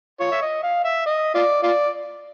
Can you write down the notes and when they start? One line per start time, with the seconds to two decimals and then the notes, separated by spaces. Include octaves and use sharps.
0.20 F4 C#5
0.31 E5
0.42 D#5
0.63 F5
0.84 E5
1.06 D#5
1.35 F4 D5
1.63 F4 D5